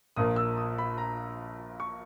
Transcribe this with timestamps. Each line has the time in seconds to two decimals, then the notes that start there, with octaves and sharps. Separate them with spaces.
0.16 A#1 A#2 A#3 D#6
0.36 E6
0.57 D#6
0.78 B5
0.98 A#5
1.80 C#6